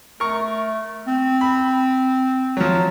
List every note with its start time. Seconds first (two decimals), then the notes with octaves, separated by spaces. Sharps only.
0.20 A3 A#4 C#6
1.07 C4
1.41 B5
2.57 F3 F#3